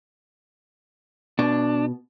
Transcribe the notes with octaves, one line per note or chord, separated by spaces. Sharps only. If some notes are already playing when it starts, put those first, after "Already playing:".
B2 D4